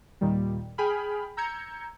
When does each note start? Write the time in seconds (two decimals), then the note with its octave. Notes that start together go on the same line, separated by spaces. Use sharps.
0.21 D#2 A#2 D#3 G3
0.78 G#4 G5 G#5 B5 F6
1.37 A#5 E6 G6 G#6 C#7